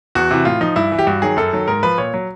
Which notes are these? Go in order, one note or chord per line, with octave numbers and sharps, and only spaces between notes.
E2 F#4
C3 E3
A2 F4
F3 D#4
G2 E4
E3
G4
G2 F#4
D#3 F#3 G#4
F#2 A4
D#3 F#3
G#2 A#4
F3 B4
A#2 C#5
F#3